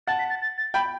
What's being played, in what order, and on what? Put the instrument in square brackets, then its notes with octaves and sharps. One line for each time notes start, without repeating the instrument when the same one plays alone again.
[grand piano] F#5 A5 [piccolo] A6
[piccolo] B6
A6
A6
A6
[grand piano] G5 B5 [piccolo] G6